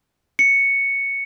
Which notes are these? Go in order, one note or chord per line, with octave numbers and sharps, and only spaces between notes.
C#7